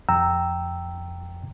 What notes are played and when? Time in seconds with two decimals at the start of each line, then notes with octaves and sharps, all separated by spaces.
0.09 F2 G5 A#5 E6